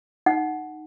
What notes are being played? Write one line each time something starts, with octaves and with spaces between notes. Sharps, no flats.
D#4 F#5